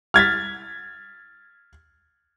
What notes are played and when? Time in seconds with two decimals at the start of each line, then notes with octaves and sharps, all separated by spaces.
0.14 F6 G#6 A6 B6